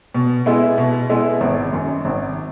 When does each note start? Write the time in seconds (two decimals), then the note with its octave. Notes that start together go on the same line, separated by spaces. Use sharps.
0.14 B2
0.46 G#3 B3 E4
0.78 B2
1.09 G#3 B3 E4
1.41 G#1
1.73 F#2 D#3
2.05 G#1